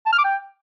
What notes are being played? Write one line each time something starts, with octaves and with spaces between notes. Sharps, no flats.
A5
F6
D6
G5